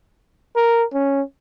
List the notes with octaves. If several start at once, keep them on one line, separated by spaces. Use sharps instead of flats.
A#4
C#4